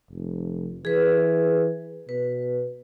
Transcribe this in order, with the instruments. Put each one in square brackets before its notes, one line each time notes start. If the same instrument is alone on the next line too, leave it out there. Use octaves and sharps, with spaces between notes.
[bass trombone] F1
[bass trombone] E3 [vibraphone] G#4 B4
[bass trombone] B2 [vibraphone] B4